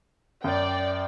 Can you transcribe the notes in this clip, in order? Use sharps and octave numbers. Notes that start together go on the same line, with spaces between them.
F#2 D5 G5